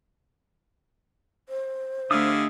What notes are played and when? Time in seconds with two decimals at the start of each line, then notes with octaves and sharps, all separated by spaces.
1.49 C5
2.11 D3 A3 D4 G4 G#4 E5 F5 D#6